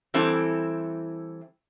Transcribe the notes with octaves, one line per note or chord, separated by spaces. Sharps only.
E3 G3 C4 E4 A4